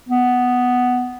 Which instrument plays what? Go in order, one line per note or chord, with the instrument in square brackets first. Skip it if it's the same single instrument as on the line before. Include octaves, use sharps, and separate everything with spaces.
[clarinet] B3